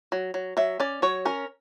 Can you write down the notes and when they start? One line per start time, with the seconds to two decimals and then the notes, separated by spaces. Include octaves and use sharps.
0.12 F#3
0.34 F#3
0.57 F#3 E5
0.80 C#4 D5
1.02 F#3 C#5
1.25 C#4 A#4